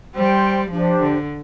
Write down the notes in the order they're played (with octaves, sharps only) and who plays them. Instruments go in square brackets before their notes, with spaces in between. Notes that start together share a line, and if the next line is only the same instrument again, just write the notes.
[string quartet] G3 [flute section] C5 G5 C6
[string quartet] F3 [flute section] D4 G4 C5
[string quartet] D3